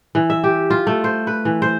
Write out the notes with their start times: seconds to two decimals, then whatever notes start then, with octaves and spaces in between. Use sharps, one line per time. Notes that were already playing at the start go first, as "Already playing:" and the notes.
0.15 E3
0.30 E5
0.44 G4
0.70 F4
0.87 A3
1.04 C5
1.27 B4
1.45 E3
1.62 C5